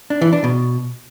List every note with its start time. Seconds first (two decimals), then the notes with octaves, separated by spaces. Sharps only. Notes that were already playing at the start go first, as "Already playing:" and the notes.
0.10 D4
0.21 E3
0.33 D4
0.44 B2